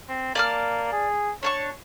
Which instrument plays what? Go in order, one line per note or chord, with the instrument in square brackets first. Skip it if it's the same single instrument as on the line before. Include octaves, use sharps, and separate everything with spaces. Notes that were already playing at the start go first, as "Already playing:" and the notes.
[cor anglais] C4
[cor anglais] A#3 [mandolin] D5 A5 F6
[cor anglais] G#4
[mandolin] D4 A5 C#6 [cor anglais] C#5